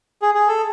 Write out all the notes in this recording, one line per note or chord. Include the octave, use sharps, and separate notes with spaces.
G#4
G#4
A4